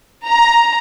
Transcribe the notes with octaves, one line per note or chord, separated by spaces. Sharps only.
A#5